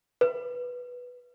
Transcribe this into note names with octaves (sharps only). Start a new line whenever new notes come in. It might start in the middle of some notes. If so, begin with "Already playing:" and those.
B4